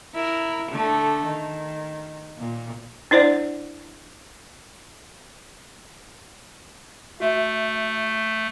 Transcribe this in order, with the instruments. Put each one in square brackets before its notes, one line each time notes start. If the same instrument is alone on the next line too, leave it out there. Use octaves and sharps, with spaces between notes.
[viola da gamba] E4 A#4
D3 A3
D#3
A#2
[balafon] D4 E4 C5 D5 F#5
[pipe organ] A3 [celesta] F#4 E5